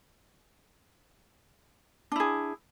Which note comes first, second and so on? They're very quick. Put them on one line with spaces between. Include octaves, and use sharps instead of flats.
D4 E4 G#4